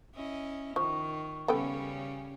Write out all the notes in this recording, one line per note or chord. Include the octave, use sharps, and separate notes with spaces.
C#4 E4 D#5
D#3 F3 C#6
C#3 G3 B3 C#4 A4 G5